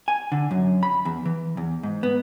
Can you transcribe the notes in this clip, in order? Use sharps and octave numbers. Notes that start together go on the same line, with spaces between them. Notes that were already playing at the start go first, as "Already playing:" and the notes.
G#5
D3
F#2
B5
E2
E3
E2
G#2
B3